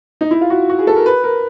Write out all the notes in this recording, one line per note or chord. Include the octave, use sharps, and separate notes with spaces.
D#4
E4
F4
F#4
F#4
G#4
A4
A#4
B4
A#4